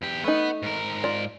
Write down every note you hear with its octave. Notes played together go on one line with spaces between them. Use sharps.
E2 G4
A3 B3 D#4 B4
G#2 A#4
F4 D5